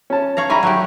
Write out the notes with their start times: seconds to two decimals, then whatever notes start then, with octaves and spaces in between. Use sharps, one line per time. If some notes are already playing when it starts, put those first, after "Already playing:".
0.10 C#4 A5
0.37 C#5 F5 A#5
0.50 G3 E4 G#5 A#5 B5 C#6
0.63 F#3 A3 G4